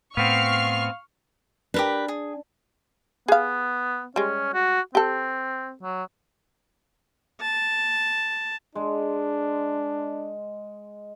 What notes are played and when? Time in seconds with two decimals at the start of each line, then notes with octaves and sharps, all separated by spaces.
0.17 A2 B3 C4 F5 C#6 F6 C7
1.74 D4 G4 A#4 B4
2.08 G#4
3.28 B3 G#4 F5
4.16 G3 G#3 C#4
4.54 F#4
4.95 C4 G4 A4
5.83 F#3
7.41 A5
8.75 G#3 D4